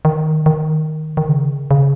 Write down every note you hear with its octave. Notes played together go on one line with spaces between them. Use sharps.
D#3
D#3
D#3
C#3
C#3